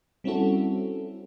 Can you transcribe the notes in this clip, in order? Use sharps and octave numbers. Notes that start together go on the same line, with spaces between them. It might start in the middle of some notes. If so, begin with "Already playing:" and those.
G3 C4 C#4 E4 F#4 A4